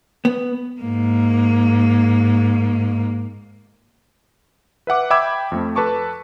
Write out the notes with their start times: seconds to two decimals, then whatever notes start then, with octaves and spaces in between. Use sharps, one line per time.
0.25 B3
0.81 G#2 A#3
4.87 B4 E5 F#5 D6
5.10 E5 G5 B5 D6 E6 G#6
5.52 F2 A3 C4
5.76 A4 B4 A5 C#6 D6